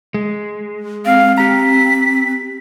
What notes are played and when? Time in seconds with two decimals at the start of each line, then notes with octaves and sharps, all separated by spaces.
0.14 G#3
1.06 C4 F5
1.38 G4 A#5 B6